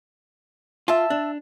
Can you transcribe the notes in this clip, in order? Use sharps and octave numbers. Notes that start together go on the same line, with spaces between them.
F4 E5 A5
D4